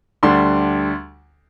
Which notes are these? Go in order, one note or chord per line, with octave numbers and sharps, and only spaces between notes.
D2 D3 G3 D4 C6